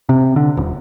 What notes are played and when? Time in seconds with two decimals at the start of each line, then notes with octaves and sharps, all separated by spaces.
0.09 C3
0.36 D3
0.57 D#1